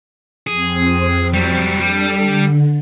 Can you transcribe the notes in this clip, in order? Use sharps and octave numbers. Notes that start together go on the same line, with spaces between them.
F2 C4 G#4
F#3 G3
G3 D4 A4
D3